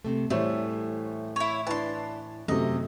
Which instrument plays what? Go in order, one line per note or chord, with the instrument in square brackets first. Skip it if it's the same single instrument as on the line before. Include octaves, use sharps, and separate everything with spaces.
[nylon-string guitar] C3 A3
[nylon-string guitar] A2 E3 [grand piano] G3 C5 C#5 [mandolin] A3
[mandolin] E4 C#5
[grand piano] D4 E4 B4 [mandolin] A5 C6
[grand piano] F#2 C3 [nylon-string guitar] A3 [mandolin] D#5